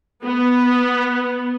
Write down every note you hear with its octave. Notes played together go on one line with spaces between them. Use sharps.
B3